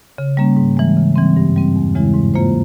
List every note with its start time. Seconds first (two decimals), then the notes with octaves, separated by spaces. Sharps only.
0.18 C#3
0.37 G3 A#3 C#4
0.57 G#2
0.77 E3 G#3
0.97 C#3
1.16 E3 G3 C4
1.37 G2
1.56 G3 C4
1.76 E2
1.95 C#3 E3 G#3 E4
2.14 G#2
2.34 E3 A#3 F4 C5